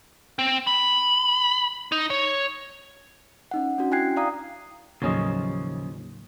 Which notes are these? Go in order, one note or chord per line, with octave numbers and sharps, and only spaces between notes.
C4
B5
D#4
C#5
C#4 D#4 F#5
C#4 D4 F#4
E4 G5 G#5 F#6 G#6 C7
D5 F5 A#5 D#6
D#2 A2 C#3 F3 F#3 C#4 D#5